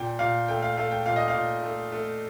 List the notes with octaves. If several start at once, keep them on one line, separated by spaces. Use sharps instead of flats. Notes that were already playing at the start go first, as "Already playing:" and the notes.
Already playing: A#2 G5
A#2 F5
A3 G5
F5
A3 F5
G5
A#2 F5
D#5
F5
A#2
A3
A3